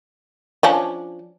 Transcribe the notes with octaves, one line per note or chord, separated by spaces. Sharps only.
F3 C#4 D4